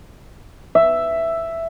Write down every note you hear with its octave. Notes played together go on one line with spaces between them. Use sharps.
E5